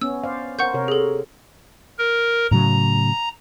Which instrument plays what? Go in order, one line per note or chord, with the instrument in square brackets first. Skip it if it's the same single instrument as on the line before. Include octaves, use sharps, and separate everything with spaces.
[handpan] B3 C#4 [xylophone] E6
[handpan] C5 D5 F5
[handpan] A#4 C5 [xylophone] F#5 C#6 G6
[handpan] C3 A#4 C#5
[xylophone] G#4 A4
[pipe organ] A#4
[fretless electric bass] A2 C#3 F#3 [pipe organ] A#5